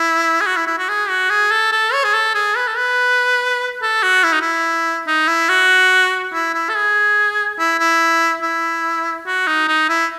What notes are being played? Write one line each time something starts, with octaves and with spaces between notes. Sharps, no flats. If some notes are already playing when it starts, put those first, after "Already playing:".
Already playing: E4
G#4
F#4
E4
E4
F#4
G#4
F#4
G#4
A4
A4
C#5
G#4
A4
G#4
B4
A4
B4
A4
F#4
E4
D#4
E4
D#4
E4
F#4
E4
E4
A4
G#4
E4
E4
E4
F#4
D#4
D#4
E4